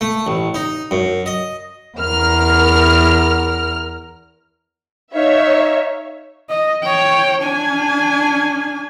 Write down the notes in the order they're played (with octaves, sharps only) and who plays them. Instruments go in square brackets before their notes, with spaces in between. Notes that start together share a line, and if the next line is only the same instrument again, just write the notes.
[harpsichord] A3
A1
D#4
F#2
D#5
[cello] E2 [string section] A#4 F6
[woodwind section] D#4 F5 [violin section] C#5 E5
[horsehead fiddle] D#5
C#5 G5
D4 G#5